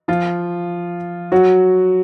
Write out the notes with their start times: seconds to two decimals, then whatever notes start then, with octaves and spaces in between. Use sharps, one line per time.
0.08 F3 F4
1.32 F#3 F#4